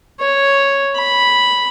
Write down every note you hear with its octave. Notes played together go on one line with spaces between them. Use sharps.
C#5
B5